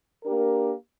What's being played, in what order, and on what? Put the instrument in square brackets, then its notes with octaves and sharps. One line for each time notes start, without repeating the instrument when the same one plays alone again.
[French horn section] A#3 D4 G4 A#4